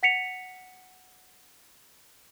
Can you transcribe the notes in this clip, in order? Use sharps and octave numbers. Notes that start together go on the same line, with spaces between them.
F#5 B6 C#7 F7